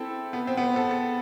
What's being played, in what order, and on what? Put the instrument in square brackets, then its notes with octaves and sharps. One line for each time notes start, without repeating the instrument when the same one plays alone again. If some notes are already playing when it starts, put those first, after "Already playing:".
Already playing: [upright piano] C4 E4 A4
B3
C4
B3
C4
A4
A4